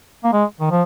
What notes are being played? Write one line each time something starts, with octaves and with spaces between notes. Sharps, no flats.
A#3
G#3
D#3
F3